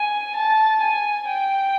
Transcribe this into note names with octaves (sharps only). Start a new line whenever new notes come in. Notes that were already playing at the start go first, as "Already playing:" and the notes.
Already playing: G#5
A5
G#5
G5